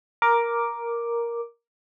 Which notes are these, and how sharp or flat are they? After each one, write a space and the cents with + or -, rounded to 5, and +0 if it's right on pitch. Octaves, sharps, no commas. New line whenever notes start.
A#4 +5 D6 +0